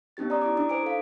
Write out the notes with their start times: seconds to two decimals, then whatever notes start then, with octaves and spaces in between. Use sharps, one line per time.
0.17 B3 C#4 D#4 G4 A6
0.30 D5 A#5 D#6
0.42 E4 A#5 D6
0.57 D4 D#4 D6 D#6
0.69 C5 G#5 D6 D7
0.83 A4 F5